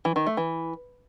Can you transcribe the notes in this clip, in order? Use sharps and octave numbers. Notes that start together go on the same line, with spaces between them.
E3
D#3
A3
E3